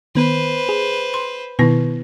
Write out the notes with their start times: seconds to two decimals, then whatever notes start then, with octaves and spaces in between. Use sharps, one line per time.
0.15 D#3 B3 B4 C5
0.69 G#4
1.14 C6
1.59 B2 D#3 B3 E4 B4